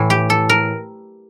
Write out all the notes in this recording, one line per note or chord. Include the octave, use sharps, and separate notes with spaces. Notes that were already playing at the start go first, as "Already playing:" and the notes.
Already playing: A2 E3
G4
A4
A#4